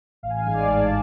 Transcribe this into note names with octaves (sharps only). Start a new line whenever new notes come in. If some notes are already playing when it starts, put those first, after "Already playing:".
A1 F5
G#5
F5
G#2 G#3 G#5
D5 F5
A1 A5